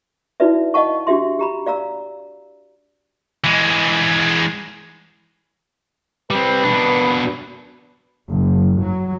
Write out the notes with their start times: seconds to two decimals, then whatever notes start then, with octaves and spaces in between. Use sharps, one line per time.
0.40 D#4 E4 F#4 B4 D5 E5
0.74 D#5 F5 F#5 A5 C#6
1.07 D4 F#4 G4 E5 C6
1.39 G4 A#5 B5
1.66 D5 F5 A#5 E6
3.44 E3 G#3
6.31 G3 C4 B4
6.63 B2 D4
8.29 F#1
8.82 F#3